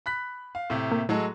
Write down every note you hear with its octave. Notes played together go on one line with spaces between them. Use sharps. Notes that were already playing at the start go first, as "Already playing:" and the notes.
B5 F#6 B6
F5
A2 C3
A#3
A2 F#3 G#3 A4